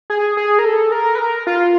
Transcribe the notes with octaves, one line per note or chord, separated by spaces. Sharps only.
G#4
G#4
A#4
A4
A#4
B4
A#4
F4